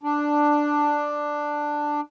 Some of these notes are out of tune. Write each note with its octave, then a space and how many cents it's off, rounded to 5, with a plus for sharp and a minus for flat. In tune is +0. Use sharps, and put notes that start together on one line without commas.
D4 +5